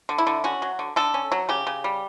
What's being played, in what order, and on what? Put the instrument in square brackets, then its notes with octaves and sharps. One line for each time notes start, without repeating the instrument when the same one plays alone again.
[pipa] D3
E4
D3
C#4 F#4
F#3
D3
D3 A4
C#4
F#3
C#3 G4
C#3
G3